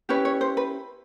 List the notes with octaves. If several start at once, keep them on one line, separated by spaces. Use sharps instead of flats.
C#4 E4 G4 B4 C#5
C#5
C5
B4